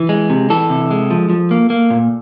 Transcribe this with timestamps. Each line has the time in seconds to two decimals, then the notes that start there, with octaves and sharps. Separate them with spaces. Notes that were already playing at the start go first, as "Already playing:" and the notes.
Already playing: E3
0.09 G#3
0.30 C3
0.50 E3 A4
0.70 C3
0.91 G#3
1.11 F3
1.30 F3
1.51 A#3
1.70 A#3
1.90 A#2